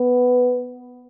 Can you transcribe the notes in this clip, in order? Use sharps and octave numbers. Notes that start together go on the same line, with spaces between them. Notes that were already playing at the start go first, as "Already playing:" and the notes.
Already playing: B3